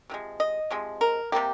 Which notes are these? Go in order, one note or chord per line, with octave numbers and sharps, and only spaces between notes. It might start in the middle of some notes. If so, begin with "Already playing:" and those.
C3 F3 G#3
D#5
C3 F3 G#3
A#4
C3 G3 A#3 G4